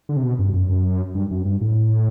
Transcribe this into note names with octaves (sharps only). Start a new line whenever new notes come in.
D3
C3
B2
G2
F#2
F#2
G2
F#2
G2
A2